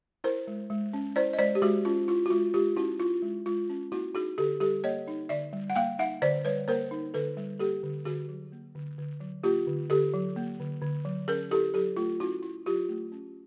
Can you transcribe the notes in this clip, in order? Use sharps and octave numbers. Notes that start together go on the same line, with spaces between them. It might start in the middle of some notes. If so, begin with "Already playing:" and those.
E4 A#4 C5
G#3
G#3
C#4
E4 C5 D5
D#5
G#3 C5 D5
G4
G#3 F#4 G#4
C#4 F4
E4 F4
F#4
G#3 F4
G#3 F4 G4
C#4 E4 F#4
E4 F4
G#3
G#3 F4
C#4
A#3 E4 F#4
D#4 F#4 G#4
D3 G4 A4
G3 G4 A4
A#3 C#5 D#5
D#4
D3 D5 E5
G3
F#5
A#3 F5 G5
D#4 E5 F#5
D3 C5 D5
G3 B4 C#5
A#3 A#4 C5
D#4
D3 A4 B4
G3
A#3 G4 A4
D3
D3 F#4 G#4
F#3
A#3
D3
D3
F#3
A#3 F4 G4
D3
D3 G4 A4
F#3
A#3
D3
D3
F#3
C#4 G#4 A#4
E4 G4 A4
F#3 G4 A4
A3 F4
C#4 E4 F#4
E4
F#3 F4 G4
A3
C#4